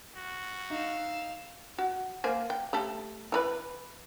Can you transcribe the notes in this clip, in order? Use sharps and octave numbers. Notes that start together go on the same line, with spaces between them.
F#4
D#4 F5 E6
F#4
A#3 C5 G#5
G5
A3 G4 A4
E3 D#4 B4